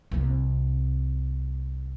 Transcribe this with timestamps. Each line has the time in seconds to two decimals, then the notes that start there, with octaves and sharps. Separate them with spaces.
0.11 C2 C4